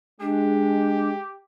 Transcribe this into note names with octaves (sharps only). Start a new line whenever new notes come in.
G#3 D4 G4